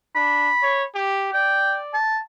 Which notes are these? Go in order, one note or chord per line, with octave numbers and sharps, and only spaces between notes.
D4 B5
C#5
G4
D5 G5
A5